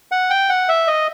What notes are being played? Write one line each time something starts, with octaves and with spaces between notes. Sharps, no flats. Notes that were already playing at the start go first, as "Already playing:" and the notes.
F#5
G5
F#5
E5
D#5